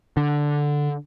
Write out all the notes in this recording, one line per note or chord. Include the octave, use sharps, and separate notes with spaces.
D3